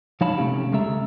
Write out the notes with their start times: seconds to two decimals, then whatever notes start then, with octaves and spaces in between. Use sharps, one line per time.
0.21 F3 D#4 C#5 F5 A5 B5
0.37 C3 A3 C#4 G4
0.72 C#2 C#3 G#3 A3 E5 A#5